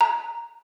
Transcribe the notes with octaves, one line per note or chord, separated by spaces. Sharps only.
A#5